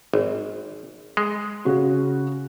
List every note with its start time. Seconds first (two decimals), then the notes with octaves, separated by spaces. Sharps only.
0.14 G#1
1.17 G#3
1.65 C#3 F#4